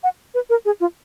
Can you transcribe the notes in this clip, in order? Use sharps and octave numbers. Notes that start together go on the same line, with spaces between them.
F#5
B4
A#4
G#4
F4